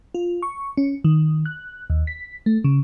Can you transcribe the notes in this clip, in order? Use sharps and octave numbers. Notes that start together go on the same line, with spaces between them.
F4
C#6
C#4
D#3
F#6
D#2
B6
A3
C#3